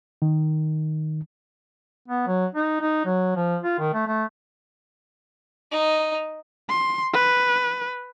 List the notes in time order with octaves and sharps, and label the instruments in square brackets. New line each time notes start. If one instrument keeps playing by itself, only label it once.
[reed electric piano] D#3
[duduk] B3
F#3
D#4
D#4
F#3
F3
F4
D#3
A3
A3
[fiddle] D#4
[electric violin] C6
B4